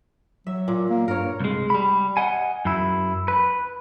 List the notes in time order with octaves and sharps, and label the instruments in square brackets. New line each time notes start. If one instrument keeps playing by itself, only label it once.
[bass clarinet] F#3 [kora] E5
[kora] A#2
[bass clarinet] A#3
[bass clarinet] G2 [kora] A#4 C#5
[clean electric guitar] C2 G#3
G3 B5
D#5 F#5 G#5
F#2 E4
B4